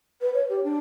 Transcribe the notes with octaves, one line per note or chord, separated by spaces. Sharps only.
B4
C#5
G4
D4